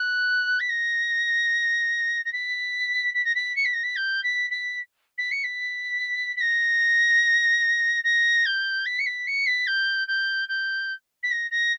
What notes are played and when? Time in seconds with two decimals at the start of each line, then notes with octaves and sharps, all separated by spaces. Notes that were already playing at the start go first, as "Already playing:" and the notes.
Already playing: F#6
0.60 B6
0.69 A#6
2.25 A#6
2.33 B6
3.14 B6
3.25 A#6
3.35 B6
3.56 C#7
3.65 B6
3.73 A#6
3.83 B6
3.96 G6
4.23 B6
4.51 B6
5.18 B6
5.31 C#7
5.44 B6
6.36 B6
6.41 A#6
8.04 A#6
8.46 G6
8.86 B6
8.99 C#7
9.06 B6
9.27 C#7
9.46 B6
9.67 G6
10.08 G6
10.48 G6
11.23 B6
11.31 A#6
11.51 A#6